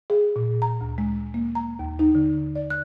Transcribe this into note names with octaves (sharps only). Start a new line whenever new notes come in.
G#4
A#2
A#5
D2
G#3
A#3
A#5
D#2
D#4
D3
D5
F#6